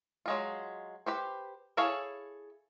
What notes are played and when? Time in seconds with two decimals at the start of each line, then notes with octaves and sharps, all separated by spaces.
0.26 F#3 G#3 F4
1.06 G4 B4 C5
1.77 E4 G#4 A4 C#5 F5